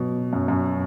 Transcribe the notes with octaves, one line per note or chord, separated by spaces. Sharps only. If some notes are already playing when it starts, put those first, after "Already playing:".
Already playing: B2 F#3
F#2
F#2